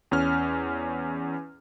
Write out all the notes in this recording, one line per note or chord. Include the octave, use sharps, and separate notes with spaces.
E2 C#4 F6